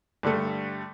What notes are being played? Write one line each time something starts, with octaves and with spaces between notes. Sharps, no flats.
G2 D3 G3 A3